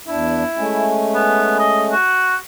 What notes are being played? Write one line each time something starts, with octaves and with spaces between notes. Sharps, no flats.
E2 D4 E4
G#3 A3 C#4
B3
D#5
F#4